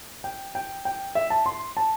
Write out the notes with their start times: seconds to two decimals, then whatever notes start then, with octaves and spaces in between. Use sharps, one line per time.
0.24 G5
0.55 G5
0.85 G5
1.15 E5
1.30 A5
1.46 C6
1.77 A5